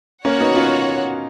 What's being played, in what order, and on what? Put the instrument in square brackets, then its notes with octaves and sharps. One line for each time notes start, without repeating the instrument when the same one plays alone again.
[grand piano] A#3 C#4 [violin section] F#4 C#5 F#5
[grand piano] B3 D#4
C#4 F4